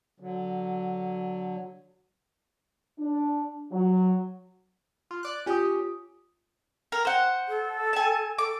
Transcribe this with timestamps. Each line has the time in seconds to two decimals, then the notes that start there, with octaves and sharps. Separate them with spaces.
0.20 D3 F#3
2.99 D4
3.71 F#3
5.11 F4
5.23 D5 F#6
5.46 C#4 F4 G4 D#6
6.92 A#4
7.05 C5 F#5
7.48 A4
7.93 G#5 A5
8.38 A4 D6